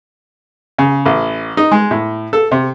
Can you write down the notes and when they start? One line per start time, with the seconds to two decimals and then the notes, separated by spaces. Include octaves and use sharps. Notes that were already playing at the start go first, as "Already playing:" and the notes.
0.78 C#3
1.06 A1
1.57 D#4
1.71 G#3
1.91 A2
2.33 A4
2.51 C3